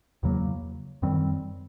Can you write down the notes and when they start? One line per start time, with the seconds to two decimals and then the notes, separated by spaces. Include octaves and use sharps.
0.23 E2 C#3 F#3 A#3
1.02 F#2 D#3 G3 C4